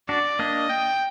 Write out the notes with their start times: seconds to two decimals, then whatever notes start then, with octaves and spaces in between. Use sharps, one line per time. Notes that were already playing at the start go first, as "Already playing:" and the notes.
0.09 D4 F#4 D5
0.39 A#3 D4 D#5
0.70 G5